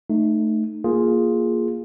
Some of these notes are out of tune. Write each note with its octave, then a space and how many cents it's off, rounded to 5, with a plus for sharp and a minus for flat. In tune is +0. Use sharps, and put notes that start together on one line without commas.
A3 +0 D#4 -20
A#3 +0 F4 +0 G#4 +0